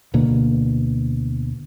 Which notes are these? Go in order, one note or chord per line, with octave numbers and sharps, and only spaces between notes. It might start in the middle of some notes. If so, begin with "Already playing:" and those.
D2 B2 D3 A#3